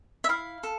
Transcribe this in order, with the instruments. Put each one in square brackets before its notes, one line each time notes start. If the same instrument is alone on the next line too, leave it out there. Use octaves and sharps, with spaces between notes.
[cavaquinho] E5
E4 F5
A4